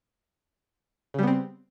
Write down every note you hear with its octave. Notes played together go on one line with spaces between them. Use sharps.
C#3 G3 B3 C4